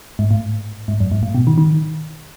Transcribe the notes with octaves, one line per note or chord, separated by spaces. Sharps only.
G#2
A2
G#2
F#2
G#2
A2
B2
D#3
D#3